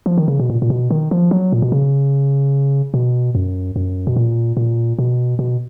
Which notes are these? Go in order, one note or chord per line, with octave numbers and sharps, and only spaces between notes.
F3
D#3
C#3
B2
A#2
A#2
B2
D#3
F3
F#3
A#2
B2
C#3
B2
F#2
F#2
B2
A#2
A#2
B2
B2